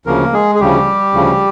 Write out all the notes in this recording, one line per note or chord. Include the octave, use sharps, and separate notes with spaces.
D2 C#3 F3 A#3 A#4
G#3 G#4
G#4
D2 C#3 F3 G3 G4
D2 C#3 F3